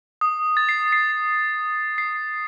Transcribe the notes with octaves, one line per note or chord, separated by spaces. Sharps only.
D#6
A6
C7
C7
C7